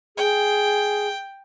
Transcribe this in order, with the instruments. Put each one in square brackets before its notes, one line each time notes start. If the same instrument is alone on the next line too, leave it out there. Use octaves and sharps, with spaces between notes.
[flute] G#4 [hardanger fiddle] G5